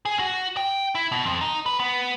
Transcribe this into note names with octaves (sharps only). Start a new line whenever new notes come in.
G#4
F#4
G5
E4
B2
F2
D#4
B4
B3